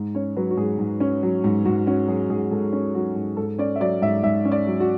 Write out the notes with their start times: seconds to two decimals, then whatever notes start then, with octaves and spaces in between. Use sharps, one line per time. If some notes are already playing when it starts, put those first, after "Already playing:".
Already playing: G#2
0.15 C#4 C#5
0.36 F#3 B4
0.51 F#4
0.57 G#2 G#4
0.79 G#2
1.00 C#4
1.23 F#3
1.44 G#2
1.65 G#2 F#4
1.87 C#4 F#4
2.08 F#3 G#4
2.29 G#2 G#4
2.51 G#2 A4
2.73 C#4
2.94 F#3 F#4
3.16 G#2
3.37 G#2 A4
3.59 C#4 D5
3.76 E5
3.80 F#3 D5
4.02 G#2 E5
4.23 G#2 E5
4.45 C#4
4.52 D5
4.67 F#3
4.80 F#4